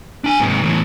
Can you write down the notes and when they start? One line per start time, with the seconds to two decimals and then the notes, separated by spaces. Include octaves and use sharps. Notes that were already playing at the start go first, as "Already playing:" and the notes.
0.24 D4 G#5
0.39 G#2 C3
0.63 E2 A2